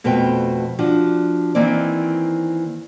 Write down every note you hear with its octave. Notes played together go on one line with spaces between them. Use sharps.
F2 B2 A3 B4 C5 G5
F3 D4 F#4
D#3 E3 A#3 C4 C5 D5